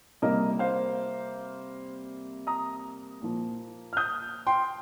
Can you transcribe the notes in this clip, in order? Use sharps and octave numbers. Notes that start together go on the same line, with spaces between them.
C3 G3 A#3 A#4 D#5
C5 F5
A#5 D#6
A#2 F3 A#3
F6
D#6 G6
G5 C6